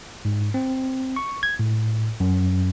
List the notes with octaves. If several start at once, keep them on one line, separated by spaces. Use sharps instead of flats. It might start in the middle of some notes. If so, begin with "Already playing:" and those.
G#2
C4
C#6
G#6
A2
F#2